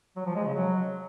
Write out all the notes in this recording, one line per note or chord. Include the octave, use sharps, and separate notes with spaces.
F#3
F3
G#3
C#3
F#3